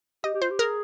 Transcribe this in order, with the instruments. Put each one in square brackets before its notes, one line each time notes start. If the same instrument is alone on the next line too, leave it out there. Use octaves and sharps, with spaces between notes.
[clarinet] G4 [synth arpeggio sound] D#5
[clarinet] G4
[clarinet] F4 [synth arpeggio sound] C5
[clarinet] G4
[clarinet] G#4 [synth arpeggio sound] A#4